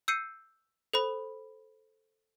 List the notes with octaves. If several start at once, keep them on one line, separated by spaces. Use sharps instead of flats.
E6 G6 C7 C#7 D#7
A4 C5 B5